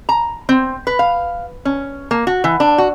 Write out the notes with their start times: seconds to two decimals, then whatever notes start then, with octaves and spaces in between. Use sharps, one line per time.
0.09 A#5
0.49 C4
0.87 B4
0.99 F5
1.65 C#4
2.11 A#3
2.27 F#4
2.44 E3
2.60 D4
2.78 F#4